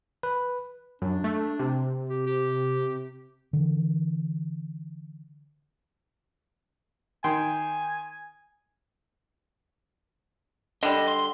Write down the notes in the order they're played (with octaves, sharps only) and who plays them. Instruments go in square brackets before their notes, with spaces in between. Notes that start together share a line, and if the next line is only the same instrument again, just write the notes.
[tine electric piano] B4
[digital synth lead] F#2 [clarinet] D4
[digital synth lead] A3
C3
[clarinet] G4
G4
[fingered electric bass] D3 E3
[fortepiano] D#3 G5 C6 [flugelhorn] G#5
[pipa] D3 G3 [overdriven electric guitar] D#5
[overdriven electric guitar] C6